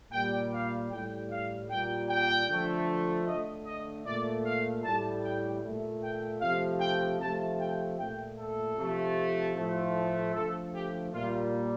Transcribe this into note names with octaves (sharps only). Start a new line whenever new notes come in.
A#2 G3 G5
F5
A2 G3 G5
F5
A#2 G3 G5
G5
D3 F3 A3
D3 A3 D#5
D#5
A#2 A3 D5
F5
A2 G3 A5
G5
A#2 A3
G5
C3 F3 A3 F5
G5
C3 F3 A3 A5
G5
A#2 A3 G5
A4
C3 F3 A3
A2 F3 A3
D3 F3 A3 A4
G4
A#2 G3 F4